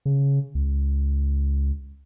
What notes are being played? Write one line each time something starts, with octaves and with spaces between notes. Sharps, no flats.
C#3
C#2